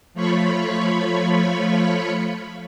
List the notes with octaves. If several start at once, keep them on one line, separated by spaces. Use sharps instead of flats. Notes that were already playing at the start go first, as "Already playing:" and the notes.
F3 A3 F4 C#5 B5 C#6